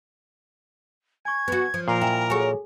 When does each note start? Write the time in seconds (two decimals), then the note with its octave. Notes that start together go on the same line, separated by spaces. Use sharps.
1.25 G#5 C#6 G#6
1.48 B3 F#4
1.74 F3
1.88 A#2 A#4 C7
2.01 E4 G5 G#5
2.30 F#4 G#4 A4 C#5 G#5